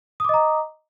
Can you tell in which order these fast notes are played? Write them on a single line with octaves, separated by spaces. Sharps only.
D#6 D6 D#5 A#5